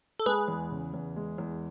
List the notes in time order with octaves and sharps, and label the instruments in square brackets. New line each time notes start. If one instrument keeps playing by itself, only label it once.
[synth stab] A4
[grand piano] G#3 [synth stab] G#4 B4
[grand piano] E2
C#3
E2
G#3
E2